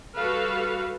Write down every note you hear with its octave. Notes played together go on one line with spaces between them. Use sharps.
G3 F#4 A4 B4 F5